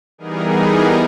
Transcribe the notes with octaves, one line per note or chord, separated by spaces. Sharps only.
E3 G3 B3 D#4 G#4 A#4